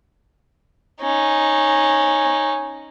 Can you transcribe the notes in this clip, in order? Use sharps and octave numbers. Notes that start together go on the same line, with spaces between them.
C#4 D#4